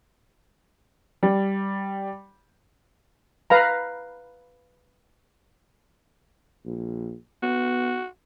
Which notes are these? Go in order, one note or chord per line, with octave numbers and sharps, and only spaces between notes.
G3
B4 F5 A#5
A#1
B3 F#4